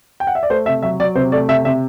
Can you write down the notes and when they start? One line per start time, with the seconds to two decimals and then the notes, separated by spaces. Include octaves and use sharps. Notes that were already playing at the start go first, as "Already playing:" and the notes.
0.20 G5
0.27 F#5
0.35 E5
0.43 D5
0.50 A3 C5
0.66 C3 E5
0.83 F#3 E5
1.00 F#3 D5
1.15 C3 C5
1.32 A3 D5
1.49 C3 E5
1.65 C3 E5